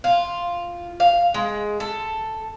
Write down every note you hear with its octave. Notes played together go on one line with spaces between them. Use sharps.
F4
F5
G#3
A4